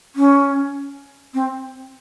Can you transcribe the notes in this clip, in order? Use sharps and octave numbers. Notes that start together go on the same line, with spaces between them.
C#4
C4